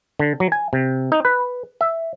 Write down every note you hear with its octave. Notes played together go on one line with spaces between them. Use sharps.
D3
F#3
G#5
C3
D#4
B4
E5